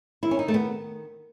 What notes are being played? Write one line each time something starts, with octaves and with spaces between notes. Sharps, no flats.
D#3 E4
C#4
D#4
D#3 A3
B3